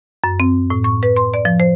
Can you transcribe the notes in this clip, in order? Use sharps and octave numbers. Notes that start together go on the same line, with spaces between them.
F#2
C4
A2
C#6
B4
C6
D5
F3
C5